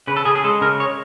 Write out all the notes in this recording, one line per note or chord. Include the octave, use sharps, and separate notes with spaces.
C#3 B4
A4
C#3 G#4
G#4
G#3 A4
C#3 A#4
C#5